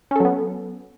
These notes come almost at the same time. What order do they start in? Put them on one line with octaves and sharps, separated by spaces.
C#4 A4 F#3 B3